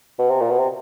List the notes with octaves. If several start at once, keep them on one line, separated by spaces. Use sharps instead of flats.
B2
C3
A#2
B2
C3